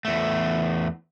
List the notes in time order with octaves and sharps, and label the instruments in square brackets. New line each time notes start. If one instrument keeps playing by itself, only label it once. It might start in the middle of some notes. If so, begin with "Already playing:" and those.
[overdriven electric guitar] E2 A3